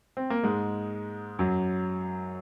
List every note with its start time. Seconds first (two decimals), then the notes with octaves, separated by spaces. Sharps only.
0.17 C4
0.30 A#3
0.44 G#2 G#3
1.39 F#2 F#3